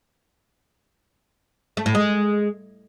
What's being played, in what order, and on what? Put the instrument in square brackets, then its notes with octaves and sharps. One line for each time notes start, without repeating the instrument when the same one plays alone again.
[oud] A3
A2
G#3